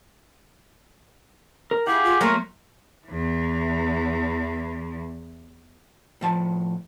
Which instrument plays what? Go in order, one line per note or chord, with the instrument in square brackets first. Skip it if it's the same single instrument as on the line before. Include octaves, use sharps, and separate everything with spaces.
[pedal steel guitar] A#4
[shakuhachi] E4 [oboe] G4 [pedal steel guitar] G#4 F5 F#5
[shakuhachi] F4
[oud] F#3 A3 A#3 [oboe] A#4 [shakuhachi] C6
[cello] E2 E3
[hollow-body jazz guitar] A2 F3 A5